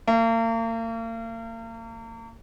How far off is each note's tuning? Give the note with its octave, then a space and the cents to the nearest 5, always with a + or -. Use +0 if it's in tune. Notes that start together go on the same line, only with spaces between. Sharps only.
A#3 -40